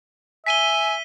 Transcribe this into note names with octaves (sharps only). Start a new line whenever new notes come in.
E5 G#5 B6 D#7 G7